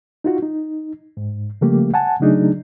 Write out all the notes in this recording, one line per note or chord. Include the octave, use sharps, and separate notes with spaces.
D#4 F4 F#4
D#4
G#2
C#3 F3 G3 A3 A#3 G4
F#5 G#5 A5
C#3 F#3 A3 D4 D#4 G#4